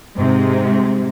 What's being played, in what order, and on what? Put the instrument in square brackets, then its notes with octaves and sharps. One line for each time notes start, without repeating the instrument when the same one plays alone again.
[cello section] G#2 C3 G#3